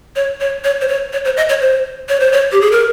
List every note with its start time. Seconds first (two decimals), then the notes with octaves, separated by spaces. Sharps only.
0.16 C#5
0.40 C#5
0.64 C#5
0.81 C5
0.88 C#5
1.13 C#5
1.25 C5
1.37 D#5
1.49 C#5
1.61 C5
2.09 C#5
2.20 C5
2.32 C#5
2.52 G4
2.61 G#4
2.72 A#4